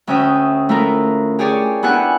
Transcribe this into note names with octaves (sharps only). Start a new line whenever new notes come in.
D2 C#4 E5 G5 D#6
A3 E4 F4 A#4
G4 G#4 C#5 D5
B3 D4 E4 G4 F#5 G#5